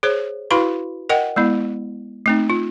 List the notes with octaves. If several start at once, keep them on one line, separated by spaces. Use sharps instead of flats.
G#4 C5 C#5
E4 F#4 B4 F5 B5 C6
A#4 D#5 F#5 G5
G#3 B3 E4
A3 C4 D#4
F4